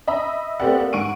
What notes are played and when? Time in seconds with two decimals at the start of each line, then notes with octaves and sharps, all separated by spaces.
0.07 D#5 E5 B5
0.60 A3 B3 C4 G4 D5 F#5
0.80 A#3
0.93 G#2 F#5 C#6 D7 D#7